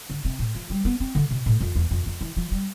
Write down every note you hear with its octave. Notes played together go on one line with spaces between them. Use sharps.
D3
C3
A2
F3
G3
B3
C4
D3
C3
A2
F2
E2
F2
F2
E3
F3
G3